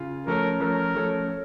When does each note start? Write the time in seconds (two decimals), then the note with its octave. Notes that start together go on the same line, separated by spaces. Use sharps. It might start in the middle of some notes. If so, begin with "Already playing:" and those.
Already playing: C#3 F4
0.27 F3 A3 C#4 A4 A#4 C#5
0.60 F3 A3 C#4 A4 A#4 C#5
0.95 F3 A3 C#4 A4 C#5
1.29 C#5